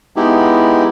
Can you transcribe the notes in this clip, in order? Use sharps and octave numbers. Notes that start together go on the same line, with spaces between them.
G#3 B3 D#4 E4 G4